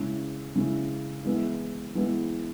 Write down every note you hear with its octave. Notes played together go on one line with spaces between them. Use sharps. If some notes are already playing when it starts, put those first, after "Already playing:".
Already playing: C#3 G#3 C#4 E4
C#3 G#3 C#4 E4
E3 G#3 B3 E4
E3 G#3 B3 E4